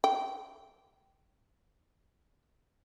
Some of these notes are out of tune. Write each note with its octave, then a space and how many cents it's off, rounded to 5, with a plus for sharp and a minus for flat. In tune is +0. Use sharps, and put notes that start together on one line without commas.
G5 -15